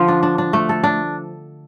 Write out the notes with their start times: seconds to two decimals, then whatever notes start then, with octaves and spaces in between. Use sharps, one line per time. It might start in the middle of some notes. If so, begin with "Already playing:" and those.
Already playing: D3 F3
0.08 D4
0.23 D4
0.38 D4
0.53 A3
0.69 A4
0.84 D4